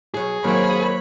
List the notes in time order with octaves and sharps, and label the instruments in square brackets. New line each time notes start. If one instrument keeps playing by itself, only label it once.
[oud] B2 F#3 [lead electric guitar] G#4
[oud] D#3 C4 [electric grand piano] F#3 A#3 A#4 [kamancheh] C#5 B5